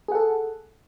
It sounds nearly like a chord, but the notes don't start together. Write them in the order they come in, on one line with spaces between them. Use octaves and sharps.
G#4 F#5 A4